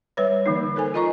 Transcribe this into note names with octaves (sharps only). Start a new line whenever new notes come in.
G3 B4 C#5
D3 E3 A#3 D#4
A4 A#4 C5 G#5
F4 A#4 D#5 A#5 C#6